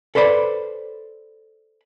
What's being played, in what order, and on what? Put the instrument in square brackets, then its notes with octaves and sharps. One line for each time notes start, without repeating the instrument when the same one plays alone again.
[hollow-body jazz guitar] A4 B4 C5 D5 B5